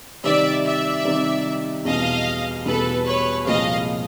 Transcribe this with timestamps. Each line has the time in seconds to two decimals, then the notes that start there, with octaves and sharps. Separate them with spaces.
0.24 C3 D#3 G3 C4 D#4 D5 E5
0.65 D5 E5
1.05 C3 D#3 G3 C4 D#4
1.85 E2 B2 G3 B3 D#5 F5
2.65 E2 B2 G3 B3 A4 B4
3.06 B4 C#5
3.46 C2 A#2 F3 G#3 C4 D#5 F5